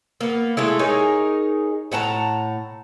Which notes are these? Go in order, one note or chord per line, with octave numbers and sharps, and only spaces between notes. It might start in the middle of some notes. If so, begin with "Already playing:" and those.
A#3 B3
G#3 A3 E4
D#4 G#4 A#4 C#5
A2 F#5 A5 A#5